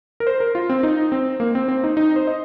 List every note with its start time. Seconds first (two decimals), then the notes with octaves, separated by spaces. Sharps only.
0.20 A#4
0.27 C5
0.40 A#4
0.55 F4
0.69 C4
0.83 D#4
1.12 C4
1.40 A#3
1.55 C4
1.68 C4
1.84 D#4
1.97 D#4
2.16 C5
2.27 D#5